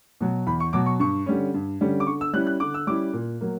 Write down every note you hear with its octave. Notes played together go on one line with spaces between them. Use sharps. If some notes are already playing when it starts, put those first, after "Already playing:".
B2 F#3
E2 B5
C#6
B2 F#3 D6
C#6
G2 C#6
D3 G3 C#4
G2
D3 G3 C#4
D6
D3 C#6
E6
G3 C#4 E4 F#6
F#6
D3 D6
E6
G3 C#4 E4 D6
A#2
F#3 A#3